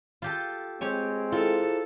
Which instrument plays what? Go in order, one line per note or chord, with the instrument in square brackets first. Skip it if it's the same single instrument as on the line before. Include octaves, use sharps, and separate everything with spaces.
[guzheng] F4 G4 A4
[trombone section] G#3 C4 [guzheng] G4 C#5 G#5
[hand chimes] E4 G#4 C5 [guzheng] F4 [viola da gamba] A4